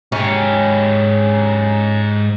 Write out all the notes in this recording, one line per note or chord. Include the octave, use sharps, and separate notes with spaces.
G#2 C#4 G4